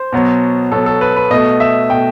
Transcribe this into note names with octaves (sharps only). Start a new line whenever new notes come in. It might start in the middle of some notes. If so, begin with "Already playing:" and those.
Already playing: C5
B2 F#3 B3
B2 F#3 B3 A4
A4
B4
B4
B2 A3 D#5
E5
B2 A3 G5